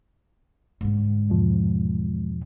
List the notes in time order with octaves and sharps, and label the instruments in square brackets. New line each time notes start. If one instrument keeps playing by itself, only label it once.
[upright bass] G#2 D3
[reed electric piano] E2 B2 F3